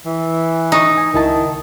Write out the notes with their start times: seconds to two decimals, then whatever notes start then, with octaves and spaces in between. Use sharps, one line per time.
0.06 E3
0.72 D#4 A#5 C#6
0.98 G#5
1.14 C#2 D#3 E4 A5